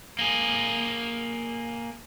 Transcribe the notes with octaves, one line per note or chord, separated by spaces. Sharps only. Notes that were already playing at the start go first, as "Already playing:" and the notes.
A#3 G#4